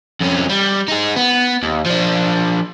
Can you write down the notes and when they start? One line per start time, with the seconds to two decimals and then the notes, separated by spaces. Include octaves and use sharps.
0.20 F2 C#4
0.49 G3
0.88 D#4 G#4
1.17 B3
1.63 D#2
1.86 F3 D4